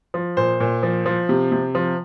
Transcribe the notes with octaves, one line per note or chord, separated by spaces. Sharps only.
F3
A#2 C5
A#2
F3
F3
C3
C3
F3